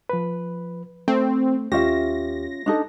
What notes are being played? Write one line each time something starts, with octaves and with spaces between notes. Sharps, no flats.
F3 B4
A3 C4
D#2 C#4 F4 G4 E5 A#6
D4 D#4 A4